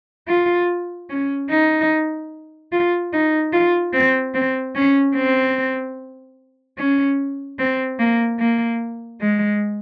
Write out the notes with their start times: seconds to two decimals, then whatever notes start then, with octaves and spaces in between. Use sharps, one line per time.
0.28 F4
1.10 C#4
1.50 D#4
2.72 F4
3.13 D#4
3.53 F4
3.93 C4
4.34 C4
4.75 C#4
5.15 C4
6.78 C#4
7.59 C4
7.99 A#3
8.39 A#3
9.21 G#3